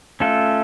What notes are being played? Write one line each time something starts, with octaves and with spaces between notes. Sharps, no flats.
A3 C#4 F4 A4